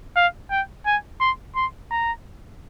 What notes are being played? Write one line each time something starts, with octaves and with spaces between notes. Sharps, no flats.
F5
G5
G#5
C6
C6
A#5